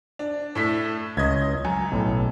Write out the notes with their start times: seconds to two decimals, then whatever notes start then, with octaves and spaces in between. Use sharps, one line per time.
0.19 D4
0.55 A2 A3 B6
1.17 C#2 D#5 G#6
1.65 F#2 G#5
1.92 B1 A2